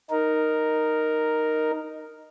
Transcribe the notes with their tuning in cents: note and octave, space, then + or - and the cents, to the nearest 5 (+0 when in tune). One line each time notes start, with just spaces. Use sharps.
D#4 -5 A#4 +0